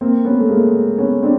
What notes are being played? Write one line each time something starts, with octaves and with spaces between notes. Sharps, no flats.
A#3 C4
B3 C#4
A3
G#3 A#3
B3 C#4
C4 D4